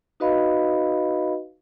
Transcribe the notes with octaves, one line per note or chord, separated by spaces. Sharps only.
D#4 F#4 B4 D#5 F5 B5